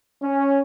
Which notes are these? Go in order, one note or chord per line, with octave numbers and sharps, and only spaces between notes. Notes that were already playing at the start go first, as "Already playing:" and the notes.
C#4